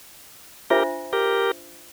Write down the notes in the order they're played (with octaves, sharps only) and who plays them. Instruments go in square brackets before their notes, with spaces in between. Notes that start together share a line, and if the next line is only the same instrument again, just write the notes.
[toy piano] D4 F4 C5 E5 [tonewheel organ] G4 A#4
[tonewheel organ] G4 A#4